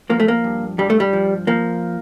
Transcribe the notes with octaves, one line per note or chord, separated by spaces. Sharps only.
F3 A#3
A3
A#3
G2
G2 G3
A3
G3
F3
F3 A#3